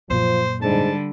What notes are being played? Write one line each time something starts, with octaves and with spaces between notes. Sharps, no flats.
F#2 A#2 F3 C5
G#2 D3 G3 A5